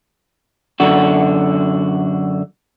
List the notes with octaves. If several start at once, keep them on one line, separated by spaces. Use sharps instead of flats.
F#2 D3 F#4